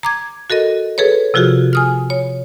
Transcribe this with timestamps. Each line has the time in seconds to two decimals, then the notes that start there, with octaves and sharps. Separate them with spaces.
0.03 A#5 D6 G#6
0.50 F#4 A4 A#4 D#5
0.98 G#4 A4 B4 C#5
1.34 C3 F3 F4 F#4 G#4
1.73 G#5 D#6 F6
2.10 C#5